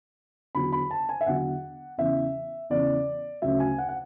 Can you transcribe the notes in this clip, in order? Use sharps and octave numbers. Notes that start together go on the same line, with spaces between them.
E2 D3 F#3 B5
B5
A5
G#5
E5
E2 D3 F#3 F#5
E2 C#3 E3 E5
E2 C#3 E3 D5
D2 C#3 F#3 E5
G#5
F#5
F#5